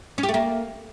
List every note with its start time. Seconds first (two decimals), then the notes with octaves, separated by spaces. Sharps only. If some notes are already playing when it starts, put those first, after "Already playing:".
0.18 C#4
0.23 G4
0.29 A3
0.34 A#3